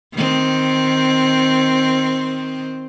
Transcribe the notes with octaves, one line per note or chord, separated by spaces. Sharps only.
D#3 C4